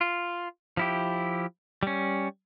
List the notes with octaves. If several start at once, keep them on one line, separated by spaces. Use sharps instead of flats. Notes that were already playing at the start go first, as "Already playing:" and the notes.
F4
F3 E4 G4
G3 C#4